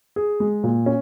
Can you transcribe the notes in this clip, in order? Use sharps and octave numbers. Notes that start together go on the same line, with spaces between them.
G#4
G#3
A#2
C#4